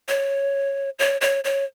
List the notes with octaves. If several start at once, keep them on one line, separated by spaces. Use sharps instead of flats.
C#5
C#5
C#5
C#5